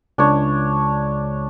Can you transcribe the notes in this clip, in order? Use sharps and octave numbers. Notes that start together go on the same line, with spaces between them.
C#2 D4 C#5